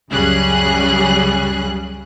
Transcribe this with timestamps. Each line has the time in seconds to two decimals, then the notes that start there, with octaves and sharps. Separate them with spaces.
0.11 C#2 F#2 C#3 G3 G#4 F#6